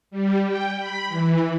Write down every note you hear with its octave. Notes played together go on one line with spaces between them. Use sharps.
G3
G5
B5
E3